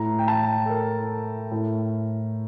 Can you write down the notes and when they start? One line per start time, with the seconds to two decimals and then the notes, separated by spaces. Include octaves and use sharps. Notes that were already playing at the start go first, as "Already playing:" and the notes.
Already playing: A2 A#5
0.19 G5
0.28 A5
0.66 A4
0.70 A#4
1.51 A2